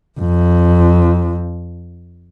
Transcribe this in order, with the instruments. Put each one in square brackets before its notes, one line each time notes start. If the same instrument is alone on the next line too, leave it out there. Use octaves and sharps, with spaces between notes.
[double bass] F2